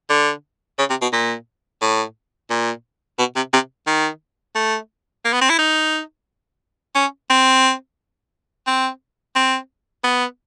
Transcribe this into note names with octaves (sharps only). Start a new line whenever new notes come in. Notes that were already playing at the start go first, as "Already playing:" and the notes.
D3
C#3
C3
B2
A#2
A2
A#2
B2
C3
C3
D#3
A3
A#3
B3
C4
E4
D#4
C#4
C4
C4
C4
B3